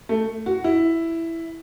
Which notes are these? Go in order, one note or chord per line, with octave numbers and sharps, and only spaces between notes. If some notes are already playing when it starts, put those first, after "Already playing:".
A3
F#4
E4